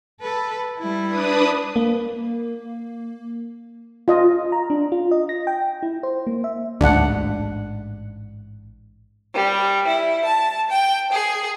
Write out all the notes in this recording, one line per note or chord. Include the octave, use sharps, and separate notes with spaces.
A4 B4
G3 E4
D4 B4 D#6
A#3
F4 D#5
A#5
D4
F4
D#5
A#6
G5
E4
C5
A#3
E5
A1 D2 G#2 D4 F#5
G3
E4
A5
G5
G#4